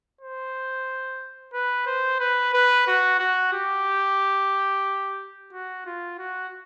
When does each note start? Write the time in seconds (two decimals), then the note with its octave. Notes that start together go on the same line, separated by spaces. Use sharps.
0.21 C5
1.53 B4
1.86 C5
2.20 B4
2.54 B4
2.87 F#4
3.19 F#4
3.53 G4
5.53 F#4
5.86 F4
6.18 F#4